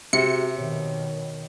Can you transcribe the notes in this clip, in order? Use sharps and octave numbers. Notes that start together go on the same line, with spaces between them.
C3 F#4 G#4 E5 C#7
B2 D#3 C#5